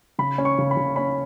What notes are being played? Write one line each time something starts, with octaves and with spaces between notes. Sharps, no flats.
C#3 B5
C#4
C#6
C#3
B5
C#3
C#4 B5